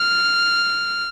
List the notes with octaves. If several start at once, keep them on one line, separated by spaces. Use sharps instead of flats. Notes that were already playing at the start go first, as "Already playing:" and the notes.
Already playing: F6